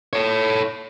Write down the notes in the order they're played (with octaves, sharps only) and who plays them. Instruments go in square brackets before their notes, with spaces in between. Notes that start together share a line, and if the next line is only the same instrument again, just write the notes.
[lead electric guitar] A4 C#5